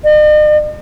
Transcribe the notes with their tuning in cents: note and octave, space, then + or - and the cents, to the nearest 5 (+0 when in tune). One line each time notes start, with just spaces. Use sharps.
D#5 -45